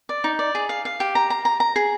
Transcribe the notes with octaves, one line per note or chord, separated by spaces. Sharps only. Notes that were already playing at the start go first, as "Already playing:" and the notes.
D5
D#4
D5
G#4
F5
F5
G4
A#5
A#5
A#5
A#5
G#4